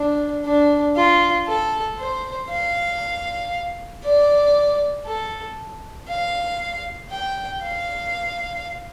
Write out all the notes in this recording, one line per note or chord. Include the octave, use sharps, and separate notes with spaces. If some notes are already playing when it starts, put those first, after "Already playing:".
Already playing: D4
D4
F4
A4
C5
F5
D5
A4
F5
G5
F5